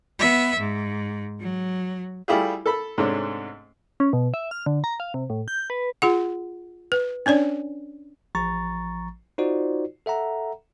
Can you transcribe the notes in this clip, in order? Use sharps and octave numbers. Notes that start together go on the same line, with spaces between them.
B3 E5
G#2
F#3
G3 A3 E4 F4 G4 G#4
A4 B5 E6
G#2 C3 A3 C#4 D4
C#4
B2
E5
F6
D3
A#5
F5
C3
A2
G6
B4
F4 G#4 F#5
B4
C#4 D4 C#5 D5
A1 F3 A#5 C#6 A6
D#4 F4 F#4 C5 D5
A4 E5 F#5 A#5